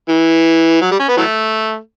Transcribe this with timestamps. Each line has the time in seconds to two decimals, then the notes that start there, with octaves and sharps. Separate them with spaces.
0.09 E3
0.81 F#3
0.91 G3
0.99 C#4
1.08 B3
1.17 E3 F#3 A3